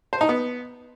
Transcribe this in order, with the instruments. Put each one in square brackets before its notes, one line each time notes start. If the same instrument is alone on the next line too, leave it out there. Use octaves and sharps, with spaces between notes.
[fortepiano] C5
D#4
B3